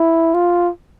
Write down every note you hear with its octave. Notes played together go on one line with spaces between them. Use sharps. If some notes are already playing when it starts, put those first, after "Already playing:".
Already playing: E4
F4